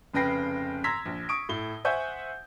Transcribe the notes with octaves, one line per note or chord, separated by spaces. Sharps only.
F1 C#3 B4 G5 A#6 C7
A#5 C6 E6 G#6 A#6 B6
A#1
C#6 D#6 D7
A2 G7
C5 E5 F#5 G#5 C#6 G6